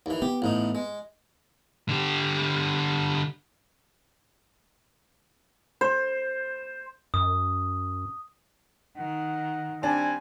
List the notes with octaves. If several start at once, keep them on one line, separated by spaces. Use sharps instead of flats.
D#2 E3
B3 G4
A1 A2 D#4
G#3
D3 G4
C5
F#2 D#6
D#3 F#5
G3 C4 D4 G#5